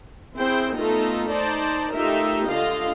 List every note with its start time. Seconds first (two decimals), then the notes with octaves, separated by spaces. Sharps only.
0.36 C4 E4 G#4 C5 G5
0.77 A3 B3 D#4 F4 A4
1.30 D#4 C5 D5 A5
1.93 A3 D#4 F4 G4 A#4 E5
2.48 D3 A3 F4 D#5 F5